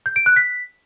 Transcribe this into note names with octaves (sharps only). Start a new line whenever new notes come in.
G6
D7
F#6
B6